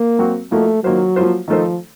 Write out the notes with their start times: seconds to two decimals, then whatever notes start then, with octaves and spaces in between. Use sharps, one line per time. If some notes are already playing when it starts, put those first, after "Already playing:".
Already playing: A#3
0.19 F#3 C4 F#4
0.51 F3 A3 A#3 D#4 F#4
0.84 D#3 F#3 A#3 F4 C5
1.16 F3 A#3 F4 C5
1.48 D#3 F3 A3 D#4 A4 C5